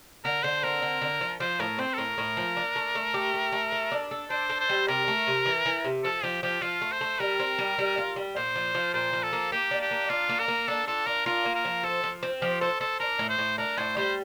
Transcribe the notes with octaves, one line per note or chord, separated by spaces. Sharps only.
D3 A#4
D3 C5
C4 A#4
D3
D3
F3
F3 C5
A2 A#4
C4 C5
A4
A2 A#4
A2
F3
D4
A3
A3
G4
A3
A3
A4
D4
A4
D4 C5
A4
C5
G3
C3 A#4
A3
C3
E3
E3
C3
F3 A4
F3 G4
F3 G4
F3 F4
A3
C5
A3
G3 A#4
C4
G3
G3
F4
G3
A#2 C5
F3
F3
A#2 C5
F3
A4
A#3
A#3 G4
D4
G4
A#3
D4 F4
A#3
A#4
A#3
D4 A4
F4 A4
D4 A#4
F4 A#4
A#3
A#4
F3
A4 C5
F3
C4
F3 G4
A4 C5
A4 C5
D4 A#4
A2
C5
A2
D4 A#4
A2 C5
G3 C5